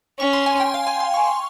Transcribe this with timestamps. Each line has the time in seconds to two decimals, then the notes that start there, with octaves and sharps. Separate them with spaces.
0.19 C#4 C#6
0.33 C6
0.46 G#5
0.60 G5
0.74 F5
0.87 G#5
1.00 C6
1.14 C#6